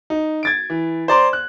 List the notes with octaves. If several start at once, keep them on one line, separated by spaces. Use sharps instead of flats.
D#4
G#6 A6 D7
E3
C5 D5 A#5 C6
F#6